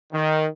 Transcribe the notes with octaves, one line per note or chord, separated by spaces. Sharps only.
D#3